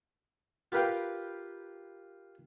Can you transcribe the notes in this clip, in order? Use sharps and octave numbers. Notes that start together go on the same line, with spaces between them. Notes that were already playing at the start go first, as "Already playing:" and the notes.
F4 G4 A#4 B4 F5 G5